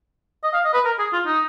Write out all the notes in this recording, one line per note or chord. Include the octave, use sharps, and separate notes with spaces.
D#5
F5
D#5
B4
A#4
G#4
F4
D#4